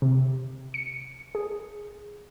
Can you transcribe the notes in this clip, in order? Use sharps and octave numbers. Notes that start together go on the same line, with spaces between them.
C3
C#7
G#4